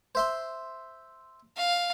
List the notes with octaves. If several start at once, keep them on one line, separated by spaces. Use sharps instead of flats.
C5 E5 C6
F5